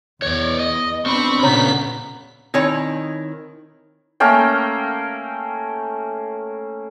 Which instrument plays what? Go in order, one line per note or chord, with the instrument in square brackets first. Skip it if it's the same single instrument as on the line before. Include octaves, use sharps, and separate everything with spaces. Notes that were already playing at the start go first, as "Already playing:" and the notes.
[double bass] E2 [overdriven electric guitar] C#5 D5
[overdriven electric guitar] D#5
[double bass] B3 D4 [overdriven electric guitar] C4 [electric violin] B5 C#6
[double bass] A#2 [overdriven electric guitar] C#3 B3 [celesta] C#5 A#5 [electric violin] B6
[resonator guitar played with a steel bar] D#3 C4 E4 C#5 G#5
[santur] A3 A#3 C#4 G5